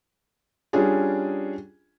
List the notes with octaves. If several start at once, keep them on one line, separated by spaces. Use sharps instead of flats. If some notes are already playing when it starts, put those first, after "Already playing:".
G3 C#4 D4 F4 G#4 G#5